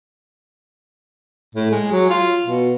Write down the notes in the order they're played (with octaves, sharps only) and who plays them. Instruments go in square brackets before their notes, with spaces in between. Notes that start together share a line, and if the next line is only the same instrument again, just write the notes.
[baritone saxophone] A2
G#3
F#3
F4
B2